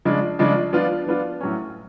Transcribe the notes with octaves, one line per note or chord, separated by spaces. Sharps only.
C#3 F3 G#3 D4
C#3 F3 G#3 D4
F3 B3 D4 F4
F3 B3 D4 F4
A2 F#3 C#4